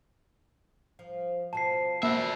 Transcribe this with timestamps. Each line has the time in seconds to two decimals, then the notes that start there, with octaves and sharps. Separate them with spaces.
0.99 F3
1.53 B2 F3 A5 C7
2.03 B2 A#3 F#4 E5